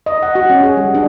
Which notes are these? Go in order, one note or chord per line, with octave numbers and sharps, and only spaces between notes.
D#5
F#5
F#4
C#4
G#4
G3
D4